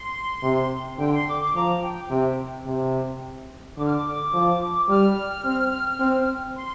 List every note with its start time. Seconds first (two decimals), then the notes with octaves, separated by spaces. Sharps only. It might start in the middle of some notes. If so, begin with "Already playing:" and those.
Already playing: C6
0.43 C3
0.98 D3 G5
1.13 C6
1.27 D6
1.41 D6
1.54 F3 A#5
1.82 G5
2.10 C3
2.66 C3
3.77 D3 D6
3.85 F6
3.93 D6
4.33 F3
4.88 G3 F6
5.45 C4
6.00 C4
6.55 C6